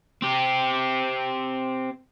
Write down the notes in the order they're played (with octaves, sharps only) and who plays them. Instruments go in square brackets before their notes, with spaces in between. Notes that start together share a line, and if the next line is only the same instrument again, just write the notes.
[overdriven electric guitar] C4 G4